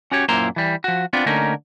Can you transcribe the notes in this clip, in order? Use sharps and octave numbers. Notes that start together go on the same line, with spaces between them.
C#4 F#4 G4 C#5
F#2 A#2 A#3 E4 C5 A#5
E3 G3
F3 F#4
B3 C4 D4 F4
D3 A3 A#3 C#4 D#4 A#4